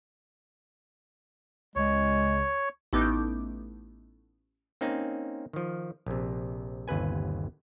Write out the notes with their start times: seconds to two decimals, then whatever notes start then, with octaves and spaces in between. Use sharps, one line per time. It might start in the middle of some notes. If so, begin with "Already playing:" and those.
1.76 C#2 G#3 C#5
2.93 A1 A3 B3 D#4 D6 G6
4.81 A#3 C4 C#4 D#4
5.53 D#3 F3
6.06 A#1 C3
6.88 G1 D#2 C3 B4 G#5